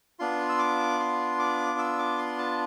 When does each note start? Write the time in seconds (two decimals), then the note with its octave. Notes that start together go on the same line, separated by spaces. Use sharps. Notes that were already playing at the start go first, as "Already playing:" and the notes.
0.19 B3 D4 F4 C6
0.49 E6
0.59 D6
0.99 C6
1.39 D6
1.79 E6
1.99 D6
2.19 C6
2.38 A5